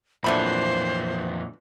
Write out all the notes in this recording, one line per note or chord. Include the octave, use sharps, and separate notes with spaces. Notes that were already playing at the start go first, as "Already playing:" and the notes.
F2 A#2 D3 E3 F#3 A3 C5 B5